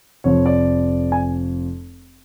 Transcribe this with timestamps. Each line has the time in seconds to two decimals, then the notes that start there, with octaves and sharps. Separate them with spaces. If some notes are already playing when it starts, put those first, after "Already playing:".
0.24 F1 F2 F3 C#5
0.46 D5
1.12 G#5